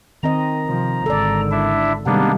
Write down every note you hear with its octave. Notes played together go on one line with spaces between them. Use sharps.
D#3 C4 D#5 A#5
C3 F3
G#1 D3 A4 D5
D4 E4 E5
C3 D#3 G3 G#3 A#3 B3 D4